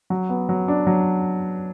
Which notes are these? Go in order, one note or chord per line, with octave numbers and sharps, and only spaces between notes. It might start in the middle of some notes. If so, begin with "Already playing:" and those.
F#3
B3
F#3
D4
F#3